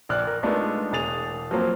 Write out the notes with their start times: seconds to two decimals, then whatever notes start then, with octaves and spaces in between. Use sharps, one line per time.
0.09 A#1 D5 F6 F#6
0.27 A#4
0.43 G#3 A3 B3 D4 D#4 F4
0.92 E1 G#4 A6 F7
1.51 F3 F#3 A#3 C4